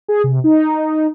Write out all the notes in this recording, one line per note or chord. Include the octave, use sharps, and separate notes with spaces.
G#4
C3
D#4